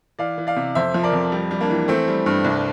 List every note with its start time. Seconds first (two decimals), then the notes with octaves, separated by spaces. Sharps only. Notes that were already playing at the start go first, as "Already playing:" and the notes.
0.19 E3 D5 F5
0.38 E3
0.47 D5 F5
0.56 C3
0.75 F2 C5 E5
0.94 F3
1.03 A#4 D5
1.13 F2
1.32 G3
1.51 G3
1.60 A#3 D4
1.70 E3
1.88 E3 A3 C4
2.08 G3
2.26 G2
2.44 C2